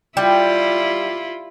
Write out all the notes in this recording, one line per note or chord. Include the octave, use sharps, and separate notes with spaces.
G3 E4 F4